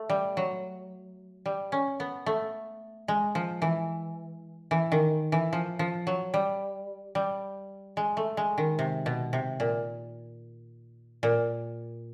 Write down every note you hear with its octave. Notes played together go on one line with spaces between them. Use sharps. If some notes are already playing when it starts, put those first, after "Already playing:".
Already playing: A3
G3
F#3
G3
C#4
B3
A3
G#3
F3
E3
E3
D#3
E3
F3
F3
F#3
G3
G3
G#3
A3
G#3
D#3
C3
B2
C3
A#2
A#2